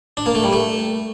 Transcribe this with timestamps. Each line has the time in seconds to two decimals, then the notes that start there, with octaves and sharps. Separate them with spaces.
0.17 D4
0.26 A#3
0.35 A3
0.44 G3
0.53 A3